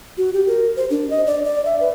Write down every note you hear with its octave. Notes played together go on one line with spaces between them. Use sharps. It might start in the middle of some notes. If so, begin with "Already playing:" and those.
F#4
G4
A#4
C5
D4
D#5
D5
D5
E5
B4